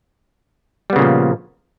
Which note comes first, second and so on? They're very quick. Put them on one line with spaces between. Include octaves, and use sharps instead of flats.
G3 B3 C#3 A#2 F3